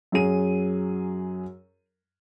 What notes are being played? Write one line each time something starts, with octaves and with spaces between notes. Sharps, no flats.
F#2 F#3 G#4 D#7